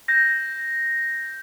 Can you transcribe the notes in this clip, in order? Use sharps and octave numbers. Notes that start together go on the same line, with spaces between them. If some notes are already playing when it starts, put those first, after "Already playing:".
G6 A#6